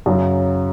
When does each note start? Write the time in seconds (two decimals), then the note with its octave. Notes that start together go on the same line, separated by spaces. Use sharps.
0.06 F#2 C#3 F#3